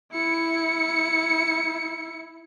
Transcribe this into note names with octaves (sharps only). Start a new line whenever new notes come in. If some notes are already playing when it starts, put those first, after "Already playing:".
E4 C#7